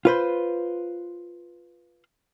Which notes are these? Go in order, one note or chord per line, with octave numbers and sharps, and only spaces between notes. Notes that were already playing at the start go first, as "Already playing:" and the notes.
F4 B4 C5